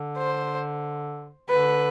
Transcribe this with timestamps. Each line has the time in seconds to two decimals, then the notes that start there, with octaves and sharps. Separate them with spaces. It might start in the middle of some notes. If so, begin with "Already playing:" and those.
Already playing: D3
0.18 C5
1.49 D3 B4